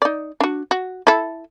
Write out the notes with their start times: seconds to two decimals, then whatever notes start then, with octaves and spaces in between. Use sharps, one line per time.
0.02 D#4 D5
0.40 D4 F#4
0.71 F#4
1.07 E4 A4